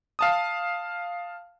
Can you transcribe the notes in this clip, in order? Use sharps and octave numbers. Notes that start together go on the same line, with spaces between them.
F5 A5 D#6